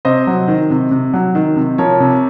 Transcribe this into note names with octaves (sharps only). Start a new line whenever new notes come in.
C3 C5 D#5
F#3
D#3
C3
C3
F#3
D#3
C3
F3 A#4 C#5
C3